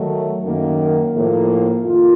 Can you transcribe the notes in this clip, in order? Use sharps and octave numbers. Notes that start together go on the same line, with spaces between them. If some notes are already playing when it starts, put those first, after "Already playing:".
Already playing: D#3 F#3 A3
F#2 D#3 A#3
A2 F3 A#3
F2 D#3 A#3 F4